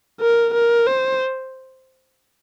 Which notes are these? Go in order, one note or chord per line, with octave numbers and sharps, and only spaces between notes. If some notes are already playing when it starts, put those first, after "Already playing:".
A#4
A#4
C5